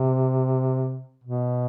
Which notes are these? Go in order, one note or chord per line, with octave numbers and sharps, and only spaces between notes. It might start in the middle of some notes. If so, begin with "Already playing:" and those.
Already playing: C3
B2